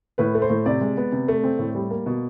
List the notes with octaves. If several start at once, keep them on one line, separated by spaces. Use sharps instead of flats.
A2 B4
A3
C5
A2
C3 D5
G#3
B3
C3
A3
C4
A2
G3
A#3
B2